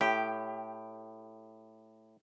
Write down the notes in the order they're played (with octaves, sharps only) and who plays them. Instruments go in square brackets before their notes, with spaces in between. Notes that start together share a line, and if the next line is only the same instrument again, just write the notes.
[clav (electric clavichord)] A2 [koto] G4